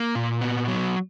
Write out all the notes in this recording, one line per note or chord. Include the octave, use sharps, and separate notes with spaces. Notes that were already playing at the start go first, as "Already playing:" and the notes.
Already playing: A#3
A#2
B3
F#3